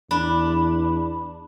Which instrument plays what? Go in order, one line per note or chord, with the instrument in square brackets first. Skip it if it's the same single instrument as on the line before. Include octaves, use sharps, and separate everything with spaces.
[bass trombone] E2 [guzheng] D4 [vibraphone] B5